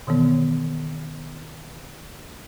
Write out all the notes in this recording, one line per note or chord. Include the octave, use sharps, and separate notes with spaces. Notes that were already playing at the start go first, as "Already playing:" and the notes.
B2 D#3 E3 B3